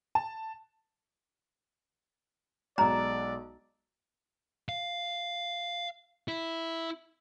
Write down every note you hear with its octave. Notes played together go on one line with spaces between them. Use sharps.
A5
B1 G#3 D5 A#5
F5
E4